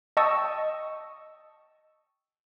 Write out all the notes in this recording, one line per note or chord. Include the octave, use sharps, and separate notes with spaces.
D#5 G5 A5 C#6 D#6 E6